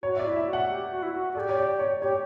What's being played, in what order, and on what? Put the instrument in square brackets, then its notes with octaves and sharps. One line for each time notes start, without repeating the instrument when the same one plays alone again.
[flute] F#4 [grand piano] C#5
[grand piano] E5
D5
[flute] E4
[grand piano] E5
[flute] F#4
[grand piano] F#5
[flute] G4
F#4
E4
F#4
[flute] A4 [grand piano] D5
[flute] G4
[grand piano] C#5
D5
C#5
[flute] G4 [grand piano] C#5